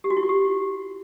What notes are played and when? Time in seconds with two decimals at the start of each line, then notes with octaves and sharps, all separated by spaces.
0.04 G4
0.10 F#4
0.17 E4
0.23 F4
0.29 G4